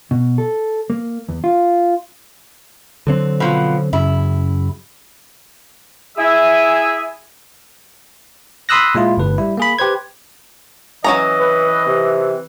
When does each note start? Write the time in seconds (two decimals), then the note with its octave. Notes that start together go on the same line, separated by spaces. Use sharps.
0.11 B2
0.38 A4
0.90 A#3
1.29 E2
1.44 F4
3.07 D3 F#3 C4
3.40 B2 F3
3.93 F#2 C#3 E4
6.17 E4 G#4 E5 G#5
8.69 B5 C6 D#6 E6 F#6 A#6
8.95 A#2 G#3 E4 F4
9.17 G1 A2 B4
9.38 G3 E4
9.57 A#3 G#4 B5
9.79 G4 B4 C5 G#6
11.04 E3 F#3 C#4 D#5 A#5
11.40 B4
11.86 C3